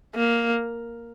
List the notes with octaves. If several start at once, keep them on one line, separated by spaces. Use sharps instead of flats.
A#3